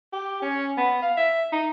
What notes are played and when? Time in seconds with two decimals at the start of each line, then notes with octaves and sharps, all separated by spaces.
0.12 G4
0.42 C#4
0.77 B3
1.02 F5
1.17 E5
1.52 D#4